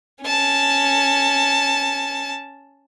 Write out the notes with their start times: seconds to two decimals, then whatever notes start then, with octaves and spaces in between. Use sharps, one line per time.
0.24 C#4 A5